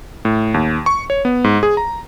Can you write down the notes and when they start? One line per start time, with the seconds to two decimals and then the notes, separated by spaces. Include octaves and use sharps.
0.25 A2
0.54 D#2
0.86 C#6
1.10 C#5
1.25 B3
1.44 G#2
1.63 G#4
1.77 A#5